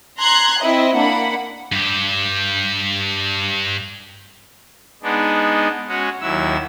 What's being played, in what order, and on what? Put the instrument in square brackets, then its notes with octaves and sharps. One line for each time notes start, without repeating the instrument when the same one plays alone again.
[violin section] A#5 C6 F#6 G#6
C4 E4 D#5
A#3 D4 F#5 B5
[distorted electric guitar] G2 G4
[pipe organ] G#3 B3 D4 D#4
G#3 C#4 F#4
D#2 F#3 E4 E6